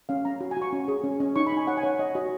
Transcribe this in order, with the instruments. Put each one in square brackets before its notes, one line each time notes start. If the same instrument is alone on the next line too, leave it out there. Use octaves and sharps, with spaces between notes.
[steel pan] C#4 F5
C#4 A#5
F#4
G#5
F#4 C#6
C#4
G#4
C#4
C#4
D#4 C#6
B5
D#4 G#5
C#5 F#5
G#5
C#5 F#5
C#5 D#5
F#4 D#5